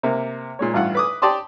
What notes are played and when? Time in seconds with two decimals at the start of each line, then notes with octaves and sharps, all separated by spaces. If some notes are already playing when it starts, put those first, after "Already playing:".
0.03 C3 A#3
0.59 A#2 G#3 C#5
0.74 A1 G2 F4 F#5
0.95 B4 D6 D#6
1.22 G4 D5 A5 C6 D#6